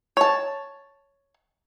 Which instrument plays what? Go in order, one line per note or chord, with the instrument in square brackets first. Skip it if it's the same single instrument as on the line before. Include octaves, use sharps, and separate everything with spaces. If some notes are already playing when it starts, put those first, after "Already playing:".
[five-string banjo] C#5 A5